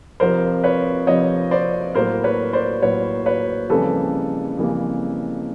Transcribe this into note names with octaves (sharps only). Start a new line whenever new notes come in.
F2 C3 F3 A#4 C5
B4 C#5
F2 C3 F3 C#5 D#5
C5 D5
A2 F#3 A#3 A#4 C5
B4 C#5
C5 D5
A2 F#3 A#3 B4 C#5
B4 C#5
F2 C#3 E3 G3 A#3 A4 B4
F2 C#3 E3 G3 A#3